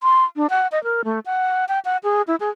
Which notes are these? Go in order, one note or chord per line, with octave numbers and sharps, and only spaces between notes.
C6
D4
F#5
D#5
A#4
A3
F#5
G5
F#5
G#4
E4
G#4